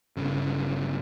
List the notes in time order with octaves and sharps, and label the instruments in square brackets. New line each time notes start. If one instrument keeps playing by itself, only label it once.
[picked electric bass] G1 C#3